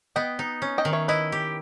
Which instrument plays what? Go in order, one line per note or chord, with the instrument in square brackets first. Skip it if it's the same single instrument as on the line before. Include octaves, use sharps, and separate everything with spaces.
[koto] B3 [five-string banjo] D#5 G5
[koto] D#4
C#4
[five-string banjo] D#5 G5
[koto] D#3
[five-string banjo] C#5 E5
[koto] E4 [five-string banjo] B4 D#5
[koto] G4